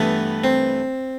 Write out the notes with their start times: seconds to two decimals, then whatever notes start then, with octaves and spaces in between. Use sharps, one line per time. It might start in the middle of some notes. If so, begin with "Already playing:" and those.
Already playing: G2 E3 A3 B3
0.44 C4